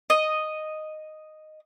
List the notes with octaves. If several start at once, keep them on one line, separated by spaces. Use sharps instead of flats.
D#5